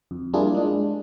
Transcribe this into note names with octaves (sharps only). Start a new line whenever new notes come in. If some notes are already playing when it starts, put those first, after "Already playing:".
F2
G3 A#3 D4 E4 F4 G#4
G#3 D4